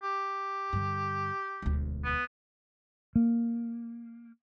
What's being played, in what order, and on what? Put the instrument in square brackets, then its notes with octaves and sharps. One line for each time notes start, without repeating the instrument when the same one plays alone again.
[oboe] G4
[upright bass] G2 D3
E1 D2
[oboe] B3
[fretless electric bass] A#3